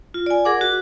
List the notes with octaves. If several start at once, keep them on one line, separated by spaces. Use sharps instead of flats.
F4
D5 G#5
G#4 A#4 F#5 D6
F#4